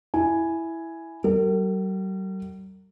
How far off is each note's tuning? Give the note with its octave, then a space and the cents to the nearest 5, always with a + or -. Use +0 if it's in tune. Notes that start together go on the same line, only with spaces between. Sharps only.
E4 +0 G#5 +0
G3 -45 A#4 -40